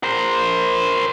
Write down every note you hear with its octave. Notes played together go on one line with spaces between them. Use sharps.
A#4 C5